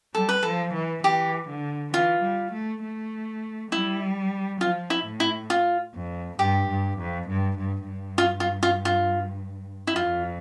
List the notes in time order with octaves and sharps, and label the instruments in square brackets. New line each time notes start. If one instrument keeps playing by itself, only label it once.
[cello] G3 [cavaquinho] A4
[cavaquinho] B4
[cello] F3 [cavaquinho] A4
[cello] E3
[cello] E3 [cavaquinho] G4
[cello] D3
[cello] E3 [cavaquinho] F4
[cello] G3
A3
A3
[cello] G3 [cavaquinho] E4
[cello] F3 [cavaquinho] F4
[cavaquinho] E4
[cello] A2
[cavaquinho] E4
F4
[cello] F2
[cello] G2 [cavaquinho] G4
[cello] G2
F2
G2
G2
G2
[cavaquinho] F4
F4
F4
F4
E4
[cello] F2 [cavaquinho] F4